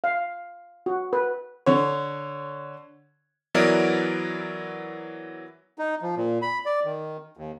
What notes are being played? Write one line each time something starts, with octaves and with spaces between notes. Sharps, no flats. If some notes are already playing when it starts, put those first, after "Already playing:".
F5
F#4
B4
D3 C#5
E3 F#3 B3 E4 A#4 D5
D#4
F3
A#2
B5
D5
D#3
D#2